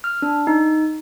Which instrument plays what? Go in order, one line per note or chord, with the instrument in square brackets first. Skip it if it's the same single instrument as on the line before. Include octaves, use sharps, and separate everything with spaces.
[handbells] F6
D4
D#4